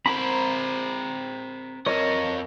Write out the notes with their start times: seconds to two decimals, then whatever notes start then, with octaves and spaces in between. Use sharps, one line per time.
0.06 C4 A#4 C5 B5
1.86 F2 A#4 C#5 D#5